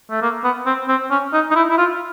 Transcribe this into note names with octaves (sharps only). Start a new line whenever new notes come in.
A3
A#3
B3
C4
C4
C#4
D#4
D#4
E4
E4
F4